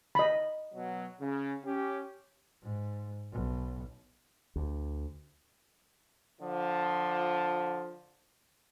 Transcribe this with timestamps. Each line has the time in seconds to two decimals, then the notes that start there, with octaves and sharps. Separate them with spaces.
0.15 D#5 B5
0.75 B2 F#3
1.20 C#3
1.65 C#4 G4
2.63 G#2
3.32 B1
4.56 D2
6.40 D3 F3